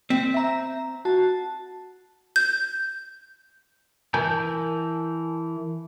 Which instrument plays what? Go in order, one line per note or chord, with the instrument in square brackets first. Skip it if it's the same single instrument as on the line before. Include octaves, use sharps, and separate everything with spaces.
[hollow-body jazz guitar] C4 [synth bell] B6
[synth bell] E5 A#5
F#4 A5
[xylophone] G6
[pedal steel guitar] E3 A#4 G#5 A5 G6